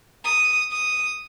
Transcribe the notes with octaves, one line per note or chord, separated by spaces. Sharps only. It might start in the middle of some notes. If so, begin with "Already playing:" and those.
D#6
D#6